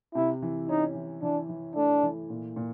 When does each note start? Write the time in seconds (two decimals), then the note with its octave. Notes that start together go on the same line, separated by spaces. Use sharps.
0.15 C3 E4
0.42 E3
0.69 C#4 D#4
0.95 E3
1.22 E3 D4
1.49 E3
1.76 A3 D4
2.03 E3
2.30 A#2
2.56 A#2